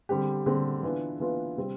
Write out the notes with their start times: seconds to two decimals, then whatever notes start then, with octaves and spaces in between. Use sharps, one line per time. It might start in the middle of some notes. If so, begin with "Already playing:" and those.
0.09 D3 G3 C4 G4
0.46 D3 G3 C4 G4
0.83 E3 B3 D4 F4
1.20 E3 B3 D4 F4
1.57 C3 G3 C4